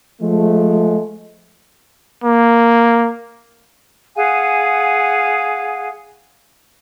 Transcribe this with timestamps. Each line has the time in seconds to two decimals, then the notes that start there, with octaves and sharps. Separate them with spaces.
0.22 F3 G#3 A3
2.24 A#3
4.15 G#4 F5 F#5 G#5